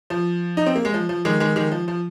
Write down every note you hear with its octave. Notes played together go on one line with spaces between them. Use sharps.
F3
D#4
C4
A#3
G#3
F3
F3
D#3 G#3
D#3 G#3
D#3 G#3
F3
F3